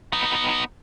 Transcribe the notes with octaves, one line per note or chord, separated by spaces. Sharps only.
B3 D#4